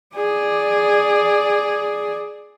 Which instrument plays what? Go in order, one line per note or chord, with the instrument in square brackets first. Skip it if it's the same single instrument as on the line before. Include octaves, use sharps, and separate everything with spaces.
[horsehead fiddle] G#4 D5